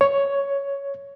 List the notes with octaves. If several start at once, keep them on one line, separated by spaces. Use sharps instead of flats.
C#5